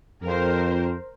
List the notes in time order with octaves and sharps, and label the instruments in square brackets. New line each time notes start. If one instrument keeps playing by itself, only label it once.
[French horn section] F2 [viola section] A#4 C5